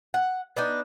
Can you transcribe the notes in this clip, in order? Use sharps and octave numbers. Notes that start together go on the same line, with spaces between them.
F#5
B3 D4 D#4